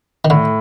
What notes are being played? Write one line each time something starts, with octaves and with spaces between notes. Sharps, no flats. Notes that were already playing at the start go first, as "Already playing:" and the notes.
D#3
A2 D3